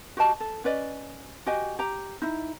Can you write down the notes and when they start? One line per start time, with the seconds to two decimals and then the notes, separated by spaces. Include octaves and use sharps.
0.17 F#4 G4 D#5 A5
0.40 A4
0.64 C#4 B4 D5 D#5
1.46 F#4 G4 D#5 G#5
1.79 G4 A#5
2.22 D#4 E4